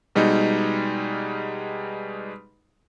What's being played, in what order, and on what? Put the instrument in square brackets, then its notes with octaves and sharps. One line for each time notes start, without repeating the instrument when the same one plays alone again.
[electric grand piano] B2 G3 G#3 D#4